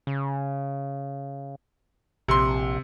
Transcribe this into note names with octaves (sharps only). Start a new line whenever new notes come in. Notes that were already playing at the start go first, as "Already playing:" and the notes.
C#3
A#1 C3 C6